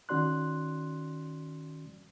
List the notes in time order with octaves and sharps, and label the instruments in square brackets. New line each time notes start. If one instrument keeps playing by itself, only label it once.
[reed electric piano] D#3 C#4 F#4 D5 C6 F#6